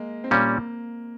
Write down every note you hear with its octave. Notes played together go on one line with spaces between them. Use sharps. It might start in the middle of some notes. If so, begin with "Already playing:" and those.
Already playing: G#3 A#3
C4
A#2 G3 A#3 C#4